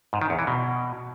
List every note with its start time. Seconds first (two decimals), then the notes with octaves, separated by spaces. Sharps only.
0.13 G#2
0.21 D#3
0.30 E2
0.39 E3
0.47 B2